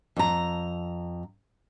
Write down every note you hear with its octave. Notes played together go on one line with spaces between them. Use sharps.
F2 A#5